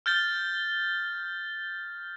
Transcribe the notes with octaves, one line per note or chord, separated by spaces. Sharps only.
F6 G6 A6 G7